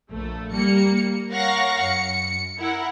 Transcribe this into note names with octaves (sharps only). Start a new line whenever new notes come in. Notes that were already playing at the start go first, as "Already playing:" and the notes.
A#1 A3
G3 A#3 C#7
A#4 C#5 F5 F#5 C#6 A#6
F#2 C#7
E4 A#4 F#5